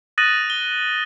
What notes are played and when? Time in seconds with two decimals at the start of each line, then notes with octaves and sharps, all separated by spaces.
0.18 D#6 F#6 A6 A#6 D#7 F#7
0.50 G7